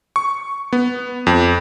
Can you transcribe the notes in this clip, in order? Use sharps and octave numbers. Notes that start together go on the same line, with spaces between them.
C#6
B3
F2